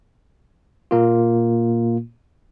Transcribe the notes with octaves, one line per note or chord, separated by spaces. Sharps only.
A#2 A#3 F4